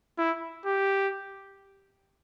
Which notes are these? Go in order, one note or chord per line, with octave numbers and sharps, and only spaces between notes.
E4
G4